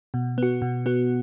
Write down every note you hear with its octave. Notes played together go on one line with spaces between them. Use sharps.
B2
B3 F#4
B2
B3 F#4